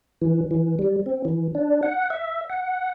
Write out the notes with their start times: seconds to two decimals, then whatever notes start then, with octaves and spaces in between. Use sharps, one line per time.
0.21 E3
0.51 E3
0.79 G3
1.06 C4
1.25 E3
1.55 D4
1.83 F#5
2.10 E5
2.50 F#5